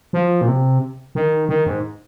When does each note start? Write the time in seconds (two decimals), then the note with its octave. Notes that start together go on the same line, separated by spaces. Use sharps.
0.13 F3
0.41 A#2
0.48 C3
1.15 D#3
1.49 D#3
1.66 G#2